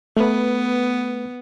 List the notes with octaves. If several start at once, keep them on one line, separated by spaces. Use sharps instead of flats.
A3 B3 B4